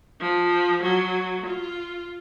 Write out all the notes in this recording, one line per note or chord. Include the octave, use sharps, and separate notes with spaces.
F3
F#3
F4